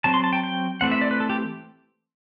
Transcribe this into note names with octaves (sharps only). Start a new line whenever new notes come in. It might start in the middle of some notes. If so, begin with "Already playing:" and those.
F#3 C4 A5
C6
A5
G5
G5
E3 A3 C4 F#5
E5
D5
B4
A4
G4